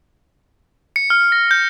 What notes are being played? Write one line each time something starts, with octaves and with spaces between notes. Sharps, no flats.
C#7
F6
A#6
G6